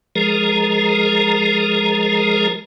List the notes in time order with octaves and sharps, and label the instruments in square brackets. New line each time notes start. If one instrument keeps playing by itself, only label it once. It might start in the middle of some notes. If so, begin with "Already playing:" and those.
[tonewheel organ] F3 G#3 G#4 A#4 A#5